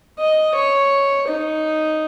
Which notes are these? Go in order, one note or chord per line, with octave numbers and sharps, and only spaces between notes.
D#5
C#5
D#4